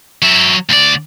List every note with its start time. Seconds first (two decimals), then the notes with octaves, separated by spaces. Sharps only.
0.22 F#3 E5
0.69 D2 D5